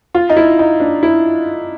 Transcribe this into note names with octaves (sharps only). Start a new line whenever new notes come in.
F4
D#4
E4
D#4
D4
E4